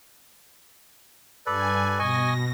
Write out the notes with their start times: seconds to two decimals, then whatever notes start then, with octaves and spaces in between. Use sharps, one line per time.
1.46 G2 A4 B4 D5 G#5
1.99 B2 D#5 G#5 C#6 A#6